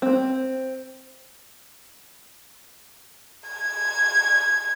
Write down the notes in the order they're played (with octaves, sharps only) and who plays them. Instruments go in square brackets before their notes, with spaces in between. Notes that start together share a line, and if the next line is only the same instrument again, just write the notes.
[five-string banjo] C4
[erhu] G#6